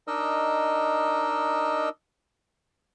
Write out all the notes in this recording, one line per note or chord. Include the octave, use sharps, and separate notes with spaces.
D4 D#4 A#4 D#5 E6